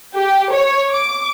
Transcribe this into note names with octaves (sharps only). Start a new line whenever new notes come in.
G4
C#5
D6